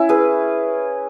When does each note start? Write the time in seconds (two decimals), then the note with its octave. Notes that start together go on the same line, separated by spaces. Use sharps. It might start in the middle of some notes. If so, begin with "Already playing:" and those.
Already playing: C#4 E4
0.09 G#4 B4